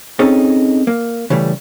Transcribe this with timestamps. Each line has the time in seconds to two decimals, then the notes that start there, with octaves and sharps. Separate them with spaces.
0.19 C4 C#4 D#4 G#4 A4
0.87 A#3
1.30 C#3 E3 G3 A3